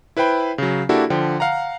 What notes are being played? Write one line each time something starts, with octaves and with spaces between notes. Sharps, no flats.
E4 B4 C5 G5 B5
C#3 F#3
A#3 D4 E4 F#4 G4 A4
D3 F3 G5
F5 F#5 A#5